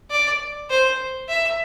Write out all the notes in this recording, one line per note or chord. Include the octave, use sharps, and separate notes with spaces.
D5
C5
E5